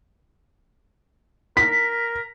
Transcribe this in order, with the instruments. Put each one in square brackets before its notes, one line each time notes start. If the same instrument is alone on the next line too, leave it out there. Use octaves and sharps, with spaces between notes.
[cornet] A#4 [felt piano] B6